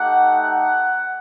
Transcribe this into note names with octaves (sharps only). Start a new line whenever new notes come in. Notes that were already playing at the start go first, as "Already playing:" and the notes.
Already playing: A3 D#4 G4 F#5
F#5